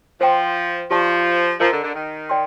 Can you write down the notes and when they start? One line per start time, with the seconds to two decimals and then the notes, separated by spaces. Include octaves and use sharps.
0.21 F3 C5 G5 C6
0.91 F3 G4 D5 A5
1.60 F3 A#4 D#5 A#5
1.72 D3
1.83 D3
1.95 D#3
2.29 D5 G5 C6